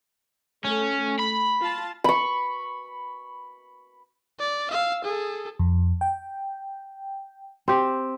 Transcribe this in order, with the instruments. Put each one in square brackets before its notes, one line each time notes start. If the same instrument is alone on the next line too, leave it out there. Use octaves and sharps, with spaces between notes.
[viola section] A3 [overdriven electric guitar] C#4
[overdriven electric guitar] B5
[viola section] F4 A5
[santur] B5 C#6
[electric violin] D5
F5 E6
G#4 A4
[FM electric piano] F2
G5
[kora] C4 G4